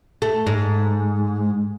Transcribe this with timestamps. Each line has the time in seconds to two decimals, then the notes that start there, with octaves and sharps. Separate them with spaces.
0.22 A3
0.47 G#2